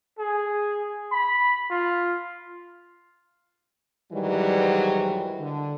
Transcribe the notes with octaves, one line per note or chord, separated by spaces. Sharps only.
G#4
B5
F4
G#2 D#3 E3 F#3 G3
D3